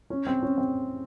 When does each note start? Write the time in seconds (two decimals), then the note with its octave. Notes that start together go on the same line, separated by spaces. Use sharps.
0.10 C#4
0.27 C4
0.43 C#4
0.58 C4